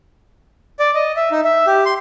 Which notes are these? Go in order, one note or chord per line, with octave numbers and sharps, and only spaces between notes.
D5
D#5
E5
D#4
E5
G4
C6